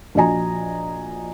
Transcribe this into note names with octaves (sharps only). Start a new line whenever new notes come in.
A#1 F4 F#4 D#5 G#5 A#5